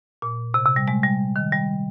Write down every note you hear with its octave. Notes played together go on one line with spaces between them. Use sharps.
A#2
C3
C3
G3
G#3
G3
D#3
G3